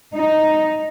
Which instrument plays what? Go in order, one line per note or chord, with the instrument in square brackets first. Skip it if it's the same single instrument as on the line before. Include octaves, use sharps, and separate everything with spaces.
[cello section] D#4